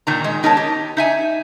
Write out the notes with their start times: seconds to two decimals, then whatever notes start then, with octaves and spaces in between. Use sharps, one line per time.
0.07 A#2 D#3 A#5
0.24 G#3
0.43 B3 D#4 A#4 C#5 A5
0.57 G4
0.97 D#4 E5 G#5